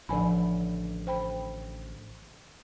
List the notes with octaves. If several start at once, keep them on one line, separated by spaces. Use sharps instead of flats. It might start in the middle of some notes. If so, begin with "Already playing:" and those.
A1 D3 F3 G#5 B5
C5 G5 B5